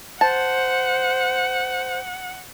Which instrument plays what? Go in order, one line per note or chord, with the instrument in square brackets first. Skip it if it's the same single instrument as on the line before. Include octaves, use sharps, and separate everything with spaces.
[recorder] C5 [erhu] F#5 [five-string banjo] A5